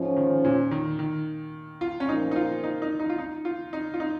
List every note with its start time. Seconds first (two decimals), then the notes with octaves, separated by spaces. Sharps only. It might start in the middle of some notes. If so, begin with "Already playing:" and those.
Already playing: G#2 F3 C#4
0.16 D#3
0.44 A#2
0.71 D#3
0.99 D#3
1.81 F4
2.00 C#4
2.08 A#2 F3 A#3 D#4
2.31 D#4
2.36 F4
2.64 D#4
2.82 D#4
3.00 D#4
3.09 F4
3.18 D#4
3.45 F4
3.73 D#4
3.94 F4
4.00 D#4